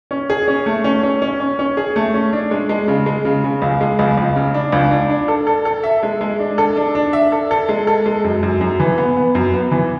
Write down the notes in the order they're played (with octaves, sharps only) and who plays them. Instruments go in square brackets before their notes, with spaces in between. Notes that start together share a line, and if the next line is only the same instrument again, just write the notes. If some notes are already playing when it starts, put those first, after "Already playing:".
[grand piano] C#4
G#4
C#4
A3
C#4
C#4
C#4
C#4
C#4
G#4
A3
C#4
D4
G#3
G#3
C#3
G#3
C#3
C#3
C#2
G#3
C#2
C#2
C#3
D4
C#2
D4
D4
A4
A4
A4
E5
G#3
G#3
D4
A4
D4
D4
E5
A4
A4
G#3
A4
G#3
F#2
F#2
F#2
E3
B3
B3
F#2
B3
E3